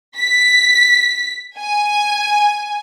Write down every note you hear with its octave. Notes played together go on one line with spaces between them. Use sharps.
B6
G#5